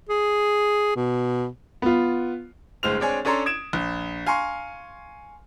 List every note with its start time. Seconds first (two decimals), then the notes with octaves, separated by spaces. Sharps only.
0.09 G#4
0.96 B2
1.82 B3 F4
2.83 G1 A2 G#3 C5 F6 F7
2.99 G#3 C4 D4 C#5 G#5
3.25 C#4 D4 A4 C#5 A#5 C6
3.46 D#6 G#6 D7 E7
3.73 A#1
4.26 F5 G#5 A#5 C6 C#6